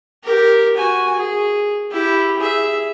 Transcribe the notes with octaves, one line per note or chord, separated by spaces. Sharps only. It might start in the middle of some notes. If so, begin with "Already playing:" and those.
G4 A#4
F#4 G#5
G#4
E4 G4
G#4 E5